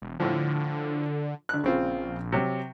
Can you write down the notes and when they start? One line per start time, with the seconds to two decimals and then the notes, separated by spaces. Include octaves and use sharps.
0.02 E1
0.20 A2 D3 F3
1.49 D2 F#6
1.64 A#1 C#3 C4 F4
2.32 C3 F#3